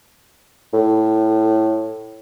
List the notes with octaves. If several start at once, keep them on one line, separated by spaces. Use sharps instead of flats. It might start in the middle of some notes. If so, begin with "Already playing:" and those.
A2